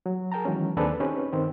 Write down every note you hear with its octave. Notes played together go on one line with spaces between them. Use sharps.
F#3
G#4 A#4 G5 A5 A#5
D#3 E3 F#3 G#3 C#4
D#2 C4 D4 G#4 A4 B4
C4 C#4 D#4 G4 B4
G2 D#3 C4